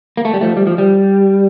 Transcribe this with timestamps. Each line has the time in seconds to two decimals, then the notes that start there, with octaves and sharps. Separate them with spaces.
0.17 A#3
0.25 A3
0.34 G3
0.41 F3 A3
0.57 G3
0.67 F3
0.78 G3